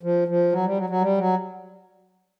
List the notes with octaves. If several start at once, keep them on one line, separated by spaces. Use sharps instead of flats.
F3
F3
F#3
G3
F#3
F#3
G3
F#3